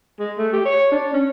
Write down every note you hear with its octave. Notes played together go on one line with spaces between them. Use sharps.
G#3
A3
G4
C#5
D4
C#4